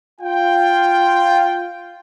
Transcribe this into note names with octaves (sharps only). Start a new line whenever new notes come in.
F4 G5